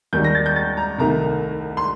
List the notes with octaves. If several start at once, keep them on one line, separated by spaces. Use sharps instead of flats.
D#2 D#3 G3 G6
A#6
A6
G6
A6
A#5
C2 C3 D#3 A3 A#5
C6